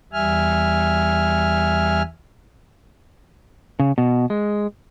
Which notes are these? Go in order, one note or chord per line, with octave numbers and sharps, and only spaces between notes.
E2 G3 E5 G#5 F6
C#3
B2
G#3